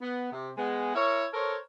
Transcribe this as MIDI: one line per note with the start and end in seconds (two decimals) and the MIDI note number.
0.02 0.29 59
0.32 0.51 48
0.58 0.92 56
0.58 0.92 59
0.95 1.26 64
0.95 1.26 70
0.95 1.26 73
1.34 1.56 69
1.34 1.56 70
1.34 1.56 72
1.34 1.56 73